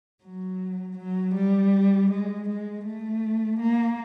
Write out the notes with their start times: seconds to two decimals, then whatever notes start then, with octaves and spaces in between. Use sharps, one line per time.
0.23 F#3
0.97 F#3
1.35 G3
2.11 G#3
2.48 G#3
2.85 A3
3.59 A#3